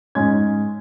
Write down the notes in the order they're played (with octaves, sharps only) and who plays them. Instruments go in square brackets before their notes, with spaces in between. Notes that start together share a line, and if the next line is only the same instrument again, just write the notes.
[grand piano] G#2 G#3 C#4 G#6